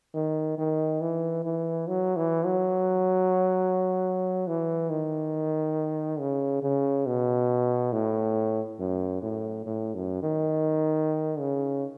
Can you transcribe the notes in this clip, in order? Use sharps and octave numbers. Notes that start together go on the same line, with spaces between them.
D#3
D#3
E3
E3
F#3
E3
F#3
E3
D#3
C#3
C#3
B2
A2
F#2
A2
A2
F#2
D#3
C#3